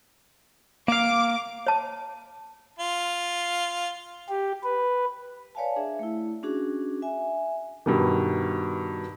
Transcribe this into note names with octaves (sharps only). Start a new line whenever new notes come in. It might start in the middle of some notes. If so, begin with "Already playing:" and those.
A#3 F5 D6
C#5 A5
F4
G4
B4
B4 C#5 D5 F5 G#5 A5
D4 G#4 E5
A3 E4
C#4 D4 F#4 G#4
E5 G#5
G2 B2 D#3